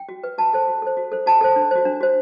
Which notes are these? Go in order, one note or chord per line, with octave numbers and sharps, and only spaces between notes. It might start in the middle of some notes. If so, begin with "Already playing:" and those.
Already playing: G5
F#4
B4
F#4 A5
A4 C5
F#4
A4 C5
F#4
A4 C5
F#4 A5
A4 C5
D4
F#4 C5
D4
F#4 C5